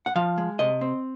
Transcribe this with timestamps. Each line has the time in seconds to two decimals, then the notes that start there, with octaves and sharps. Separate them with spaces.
0.06 F#5
0.16 F3 F5
0.38 G#3
0.59 C3 D#5
0.81 C4